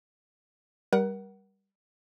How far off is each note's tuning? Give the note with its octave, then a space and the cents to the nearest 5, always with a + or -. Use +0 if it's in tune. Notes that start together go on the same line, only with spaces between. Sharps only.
G3 +0 A#4 +35 F#5 +20